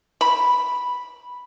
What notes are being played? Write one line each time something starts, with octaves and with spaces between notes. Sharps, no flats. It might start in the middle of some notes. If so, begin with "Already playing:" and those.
B5